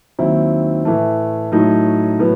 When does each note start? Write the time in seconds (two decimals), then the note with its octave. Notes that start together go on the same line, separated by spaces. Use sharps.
0.19 D#2 D#3 F#3 C4 E4
0.85 A2 E3 A3
1.52 A2 F#3 A3 D#4
2.20 A2 F#3 B3